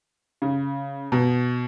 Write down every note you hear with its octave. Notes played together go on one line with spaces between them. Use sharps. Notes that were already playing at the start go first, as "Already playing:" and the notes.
C#3
B2